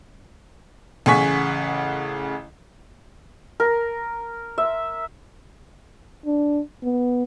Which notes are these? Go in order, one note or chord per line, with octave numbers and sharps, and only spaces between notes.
A1 C#3 F#5 G#5 C#6 B6
A#4
E5
D4
B3